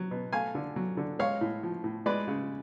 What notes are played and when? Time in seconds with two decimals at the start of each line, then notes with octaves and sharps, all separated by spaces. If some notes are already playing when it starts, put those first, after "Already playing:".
Already playing: F#3
0.11 B2
0.32 A3 F5 G#5
0.55 D3
0.76 F#3
0.97 D3
1.19 G#3 C#5 F5
1.41 A2
1.63 F3
1.84 A2
2.06 G#3 B4 D5
2.28 C#3